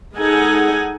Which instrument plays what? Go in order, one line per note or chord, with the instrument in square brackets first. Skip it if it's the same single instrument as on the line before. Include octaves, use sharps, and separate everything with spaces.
[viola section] G#3 D#4 A4 F#5 G#5